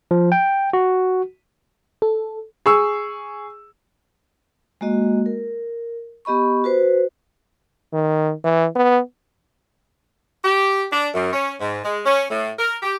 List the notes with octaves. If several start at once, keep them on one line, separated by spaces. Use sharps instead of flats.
F3
G5
F#4
A4
G#4 C#6 E6
G#3 A#3 F#4 D#5
A#4
B3 G4 D#5 B5 C#6
F#4 B4 C5
D#3
E3
B3
G4
D4
F#2
C#4
G#2
G#3
C#4
A2
A#4
G4